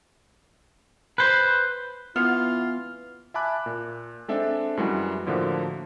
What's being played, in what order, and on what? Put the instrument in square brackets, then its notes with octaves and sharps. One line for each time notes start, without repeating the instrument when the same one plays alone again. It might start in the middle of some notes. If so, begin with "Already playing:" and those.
[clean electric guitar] B4 C5
[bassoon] E3 [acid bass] B3 [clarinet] F4 [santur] F5
[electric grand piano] E5 G#5 A5 B5 D6 F#6
A#2
G#3 C4 D4 A4 E5
F#2 E3 G3 G#3 F#4
A2 D3 F3 A#3 D4 F#4